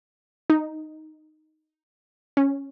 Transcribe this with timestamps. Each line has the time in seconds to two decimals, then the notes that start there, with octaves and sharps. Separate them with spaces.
0.50 D#4
2.37 C#4